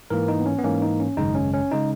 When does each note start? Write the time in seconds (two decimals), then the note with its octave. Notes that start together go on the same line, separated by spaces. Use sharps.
0.10 G#2 E3 A#3 A#4
0.28 D#4
0.40 B3
0.46 C#4
0.58 B3
0.64 G#2 E3 A#3 C#4
0.82 D#4
1.00 C#4
1.17 G#1 F#2 C#3 G#3 D#4
1.35 C#4
1.54 C#4
1.71 C#3 G#3 D#4